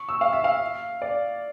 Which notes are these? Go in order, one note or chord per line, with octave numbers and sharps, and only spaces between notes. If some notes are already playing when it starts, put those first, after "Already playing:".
Already playing: C#6
E6
F5
E5
F5
D5